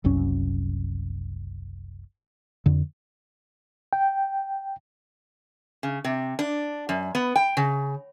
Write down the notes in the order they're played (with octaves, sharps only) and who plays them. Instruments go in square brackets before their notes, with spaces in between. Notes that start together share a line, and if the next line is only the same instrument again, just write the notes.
[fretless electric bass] F#1 C2 F#2 C#4
F2 D3
[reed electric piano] G5
[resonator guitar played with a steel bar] C#3
C3
D4
F#2
B3
G5
C#3